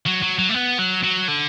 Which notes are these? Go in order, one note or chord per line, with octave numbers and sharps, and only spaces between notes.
F#3
F#3
F#3
A3
B3
F#3
F#3
D3